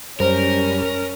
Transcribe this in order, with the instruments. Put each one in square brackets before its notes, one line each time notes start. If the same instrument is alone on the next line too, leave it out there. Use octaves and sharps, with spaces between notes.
[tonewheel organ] F#2 G3 [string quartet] C#4 [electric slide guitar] A#4 [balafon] C5